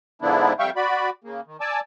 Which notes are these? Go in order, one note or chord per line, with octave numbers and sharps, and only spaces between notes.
G#2 D3 F3 B3 D4 E4
F2 G3 E5 F5 G5 C#6
F#4 D5 B5
C#3 A#3
D#3
D5 G#5 A5 D6 E6